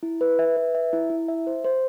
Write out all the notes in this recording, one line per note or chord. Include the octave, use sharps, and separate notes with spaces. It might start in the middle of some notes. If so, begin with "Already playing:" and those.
E4
B4
E5
B4
E5
E4
E4
E5
C5
C5